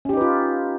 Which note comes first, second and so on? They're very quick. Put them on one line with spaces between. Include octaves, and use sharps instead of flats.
C#4 G4 D#4 B4 F4